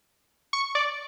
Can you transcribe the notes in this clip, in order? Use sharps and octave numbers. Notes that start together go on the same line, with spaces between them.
C#6
D5